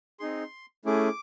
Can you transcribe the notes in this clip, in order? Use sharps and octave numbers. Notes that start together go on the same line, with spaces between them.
C4 D#4 G#4 C6
A3 C#4 E4 G#4 D6